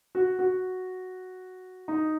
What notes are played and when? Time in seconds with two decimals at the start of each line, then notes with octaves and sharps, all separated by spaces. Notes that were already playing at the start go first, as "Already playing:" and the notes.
0.15 F#4
0.39 F#4
1.88 D#4